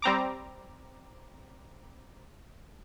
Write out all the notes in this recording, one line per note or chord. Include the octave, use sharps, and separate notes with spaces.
G3 C4 A#5 D6